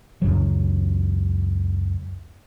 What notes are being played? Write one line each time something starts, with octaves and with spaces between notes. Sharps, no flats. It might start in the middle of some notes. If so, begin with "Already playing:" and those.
C#2 F#2 F#3